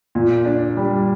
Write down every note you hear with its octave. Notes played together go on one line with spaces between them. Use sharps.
A#2
D4
G3